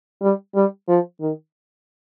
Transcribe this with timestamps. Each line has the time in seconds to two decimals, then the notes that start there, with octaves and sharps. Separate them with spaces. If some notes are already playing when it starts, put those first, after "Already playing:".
0.22 G3
0.55 G3
0.88 F3
1.21 D#3